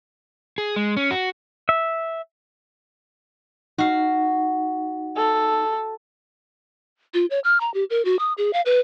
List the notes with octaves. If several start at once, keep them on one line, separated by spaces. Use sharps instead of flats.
G#4
G#3
C#4
F#4
E5
D#4 F#4 F5
A4
F4
C#5
F6
A#5
G4
A#4
F#4
D#6
G#4
F5
B4